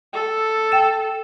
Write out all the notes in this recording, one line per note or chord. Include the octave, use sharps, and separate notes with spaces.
A4
G5 E7